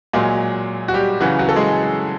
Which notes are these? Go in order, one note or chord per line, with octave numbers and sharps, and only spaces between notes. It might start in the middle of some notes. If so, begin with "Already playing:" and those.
A#2 F#3 G#3 G#4
F#4
G3 G4
C#3 E3 F#3 F#4
F#3 F#4
A4
G#3 G#4